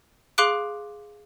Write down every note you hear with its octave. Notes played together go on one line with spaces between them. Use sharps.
G#4 F5 C6 D6 F#6 D7